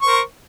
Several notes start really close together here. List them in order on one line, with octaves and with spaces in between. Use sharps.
C#6 C5 A#4